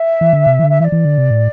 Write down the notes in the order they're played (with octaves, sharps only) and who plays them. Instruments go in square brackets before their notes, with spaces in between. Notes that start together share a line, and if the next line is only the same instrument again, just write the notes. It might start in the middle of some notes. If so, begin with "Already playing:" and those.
Already playing: [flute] E5
[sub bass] E3
D3
C3
E3
D3
[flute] E5
[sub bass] E3 [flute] E5
[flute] D5
[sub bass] E3
D3
C3
A2